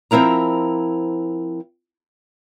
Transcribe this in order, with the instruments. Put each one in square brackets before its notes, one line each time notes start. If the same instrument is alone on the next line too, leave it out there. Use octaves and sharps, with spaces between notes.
[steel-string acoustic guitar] F3 C4 E4 A#4 A#5